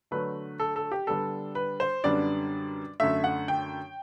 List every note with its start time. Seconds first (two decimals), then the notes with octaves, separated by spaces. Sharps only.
0.11 D3 F#3 A3 D4 B4
0.59 A4
0.76 A4
0.92 G4
1.07 D3 G3 B3 D4 A4
1.55 B4
1.80 C5
2.04 F#2 D3 G3 B3 D4 D5
3.00 F#2 D3 A3 E5
3.24 F#5
3.48 G5